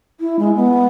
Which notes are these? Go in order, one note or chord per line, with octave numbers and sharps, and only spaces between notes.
E4
G#3
B3